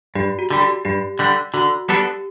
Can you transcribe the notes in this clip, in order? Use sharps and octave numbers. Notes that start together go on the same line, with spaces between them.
G2 G4
F#4
D3 G3
G4
G2 G4
D3 G3
D3 F#4
G3 B3 D4 G4 A4